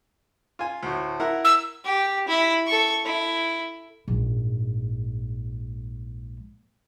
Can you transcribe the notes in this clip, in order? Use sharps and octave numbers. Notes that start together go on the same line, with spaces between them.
F4 G#5
D2 A2
E4 A#4 F#5
E6
G4
E4
A4 C#6
E4
A#1 G#2